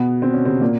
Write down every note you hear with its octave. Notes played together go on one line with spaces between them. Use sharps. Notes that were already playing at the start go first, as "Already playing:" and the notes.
Already playing: B2 B3
C4
C#4
C3 C4
A#2 A#3